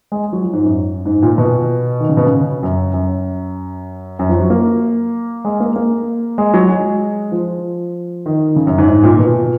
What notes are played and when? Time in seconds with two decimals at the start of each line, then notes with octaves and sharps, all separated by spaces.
0.12 G#3
0.33 F#3
0.43 F3
0.53 G#2
0.64 F#2
1.06 G#2
1.22 A#2
1.38 B2
2.00 D#3
2.09 C#3
2.17 B2
2.26 C#3
2.63 F#2
2.94 F#2
4.19 F#2
4.29 F3
4.40 F#3
4.50 A#3
5.45 G#3
5.60 A#3
5.76 A#3
6.38 G#3
6.54 F#3
6.69 G#3
7.32 F3
8.26 D#3
8.56 C#3
8.67 F#2
8.78 G#2
8.89 G#2
9.03 A#2
9.19 B2